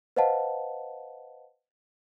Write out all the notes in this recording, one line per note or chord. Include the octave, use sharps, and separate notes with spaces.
B4 C5 D#5 F5 F#5 A5